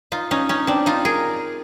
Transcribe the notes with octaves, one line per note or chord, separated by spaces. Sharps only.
D#4 F4
C#4 D#4
C#4 D#4
C4 D4
D#4 F4
G#4 A#4